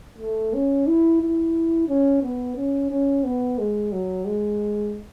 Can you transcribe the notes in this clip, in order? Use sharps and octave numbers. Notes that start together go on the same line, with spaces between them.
A3
C#4
E4
E4
C#4
B3
C#4
C#4
B3
G#3
F#3
G#3